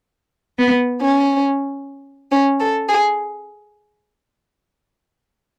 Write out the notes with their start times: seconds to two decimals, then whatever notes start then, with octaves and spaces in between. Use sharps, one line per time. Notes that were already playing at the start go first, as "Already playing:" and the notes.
0.58 B3
1.01 C#4
2.31 C#4
2.60 A4
2.89 G#4